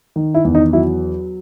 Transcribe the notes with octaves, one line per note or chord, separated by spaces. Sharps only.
D#3
E4
E2
D#4
F#3 E4